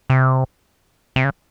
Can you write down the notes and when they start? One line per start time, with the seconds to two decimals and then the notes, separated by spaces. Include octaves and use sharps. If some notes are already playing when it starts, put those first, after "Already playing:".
0.10 C3
1.16 C3
1.24 C#3